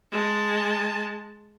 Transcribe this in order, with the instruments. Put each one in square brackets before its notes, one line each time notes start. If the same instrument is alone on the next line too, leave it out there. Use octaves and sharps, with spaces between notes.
[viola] G#3 A5